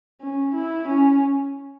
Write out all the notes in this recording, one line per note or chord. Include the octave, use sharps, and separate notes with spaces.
C#4
E4
C#4